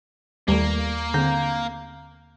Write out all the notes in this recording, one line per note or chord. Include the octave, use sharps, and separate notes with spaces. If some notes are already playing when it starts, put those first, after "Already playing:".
D#2 G3 A3 A#3
D3 C4 A#5 G6